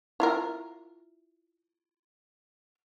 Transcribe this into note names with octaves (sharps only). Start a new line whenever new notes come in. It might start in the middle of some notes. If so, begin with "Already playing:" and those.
E4 F4 A#4